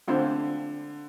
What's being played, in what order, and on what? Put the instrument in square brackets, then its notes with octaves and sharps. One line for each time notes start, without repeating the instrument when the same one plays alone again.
[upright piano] D3 [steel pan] A3 C4 F4 C5